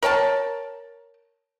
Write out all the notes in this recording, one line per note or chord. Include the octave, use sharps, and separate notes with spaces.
A#4 C#5 G5 A5